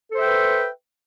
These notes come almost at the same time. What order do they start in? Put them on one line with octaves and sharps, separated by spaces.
A4 C5 E5 G5 B4